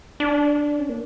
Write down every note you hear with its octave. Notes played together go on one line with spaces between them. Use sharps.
D4
C#4
A#3